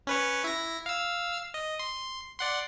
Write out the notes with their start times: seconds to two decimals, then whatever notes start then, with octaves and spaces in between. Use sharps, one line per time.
0.07 C#4 B4 C#5
0.44 E4 A#6
0.86 F5 E6
1.54 D#5
1.79 C6
2.39 D5 F#5 C6